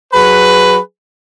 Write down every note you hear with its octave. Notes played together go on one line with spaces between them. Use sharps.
F#3 G#4 B4